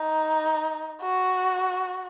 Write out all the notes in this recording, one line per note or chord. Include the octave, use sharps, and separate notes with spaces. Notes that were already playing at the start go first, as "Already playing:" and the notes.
Already playing: D#4
F#4